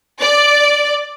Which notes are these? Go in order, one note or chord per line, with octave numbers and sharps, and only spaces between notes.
D5